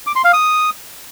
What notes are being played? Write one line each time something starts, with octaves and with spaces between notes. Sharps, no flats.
D6
C6
F5
D#6